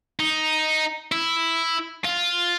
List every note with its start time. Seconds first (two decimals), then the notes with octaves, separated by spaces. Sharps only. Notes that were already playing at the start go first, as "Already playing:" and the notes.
0.19 D#4
1.12 E4
2.05 F4